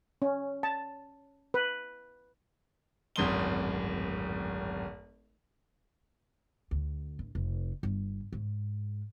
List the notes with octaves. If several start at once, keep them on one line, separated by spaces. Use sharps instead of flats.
C#4
A5
B4
D1 G#1 F#2 C6 D#6 G7
D2
D1
F1
G1
G#2